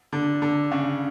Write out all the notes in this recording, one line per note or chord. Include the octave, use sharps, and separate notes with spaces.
D3
D3
C#3